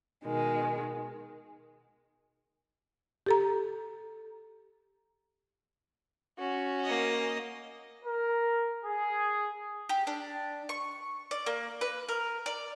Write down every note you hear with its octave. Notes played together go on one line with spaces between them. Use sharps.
B2 D#3 G#3
G4 A4 A#5
C#4 F#4
A#3 D#5
A#4
G#4
G4
D4
C#6
D5
A#3
B4
A#4
D5